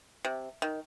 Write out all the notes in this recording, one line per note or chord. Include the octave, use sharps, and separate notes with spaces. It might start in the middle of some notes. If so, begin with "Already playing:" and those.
C3
D#3